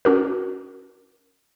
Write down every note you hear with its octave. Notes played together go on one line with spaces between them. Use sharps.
C#4 F#4 A#4